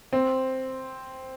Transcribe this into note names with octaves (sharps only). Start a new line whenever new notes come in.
C4